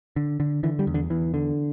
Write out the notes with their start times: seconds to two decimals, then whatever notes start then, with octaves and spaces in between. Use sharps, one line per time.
0.16 D3
0.40 D3
0.63 D3 E3
0.79 G3
0.87 E2
0.94 D3
1.10 E2 E3
1.34 D3